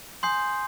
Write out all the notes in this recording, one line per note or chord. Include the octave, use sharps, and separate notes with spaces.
G#5 C6 D#6 G6 C7